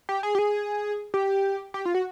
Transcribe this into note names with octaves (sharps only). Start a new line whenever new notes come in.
G4
G#4
G4
G#4
G4
G4
F4
F#4